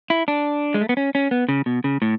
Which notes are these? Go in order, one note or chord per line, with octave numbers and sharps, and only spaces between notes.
E4
D4
G#3
A3
B3
C#4
C#4
B3
C#3
B2
C#3
A2